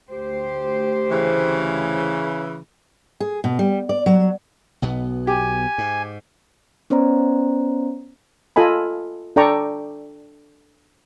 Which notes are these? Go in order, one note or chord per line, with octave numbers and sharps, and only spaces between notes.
D2 G4 C5
C#3 E3
G#4
B2
G3
D5
F#3
B1 B2 B3
G4 G#5
G#2
B3 C#4 C5 D5 A#5
F4 A4 D#5 G#5 B5
D4 A4 D5 G5 A#5 C#6